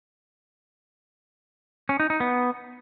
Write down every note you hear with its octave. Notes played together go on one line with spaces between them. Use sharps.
C#4
D#4
D#4
B3